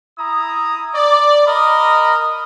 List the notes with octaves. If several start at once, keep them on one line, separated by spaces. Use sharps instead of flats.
E4 A#5 D#6
D5
A#4 D#5 B5